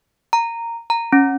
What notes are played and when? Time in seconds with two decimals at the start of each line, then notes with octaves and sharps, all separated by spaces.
0.33 A#5
0.90 A#5
1.13 C#4